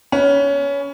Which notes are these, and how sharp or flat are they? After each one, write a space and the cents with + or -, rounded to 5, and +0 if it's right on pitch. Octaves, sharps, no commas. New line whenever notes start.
C#4 +20 B4 +0